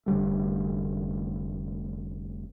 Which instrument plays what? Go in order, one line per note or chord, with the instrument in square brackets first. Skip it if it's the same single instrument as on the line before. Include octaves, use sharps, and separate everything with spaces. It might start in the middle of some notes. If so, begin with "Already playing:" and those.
[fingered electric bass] F1 D3 G3 A3